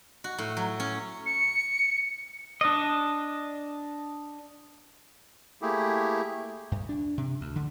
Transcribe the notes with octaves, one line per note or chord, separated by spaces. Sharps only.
F#4
A2
F#3
C#4
C#7
D4 D#5
A3 A#3 E4 G4 G#4
G2
D4
C3
D2
D3